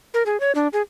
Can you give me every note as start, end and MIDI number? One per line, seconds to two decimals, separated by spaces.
0.14 0.23 70
0.26 0.39 68
0.40 0.52 73
0.55 0.68 62
0.73 0.82 68